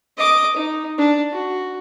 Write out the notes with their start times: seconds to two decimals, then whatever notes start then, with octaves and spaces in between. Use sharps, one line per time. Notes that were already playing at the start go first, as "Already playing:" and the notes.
0.17 D#5 D6
0.56 D#4
0.98 D4
1.32 F#4